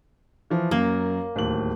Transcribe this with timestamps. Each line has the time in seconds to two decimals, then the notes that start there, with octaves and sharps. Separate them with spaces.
0.50 E3 F3
0.71 F#2 A#3
1.36 D1 D#2 F#7